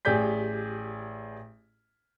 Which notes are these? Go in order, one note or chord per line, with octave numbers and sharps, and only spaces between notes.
A1 G4 G#4 D5 G6 B6